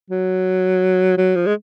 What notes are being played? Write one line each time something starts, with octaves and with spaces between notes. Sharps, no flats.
F#3
F#3
F3
G#3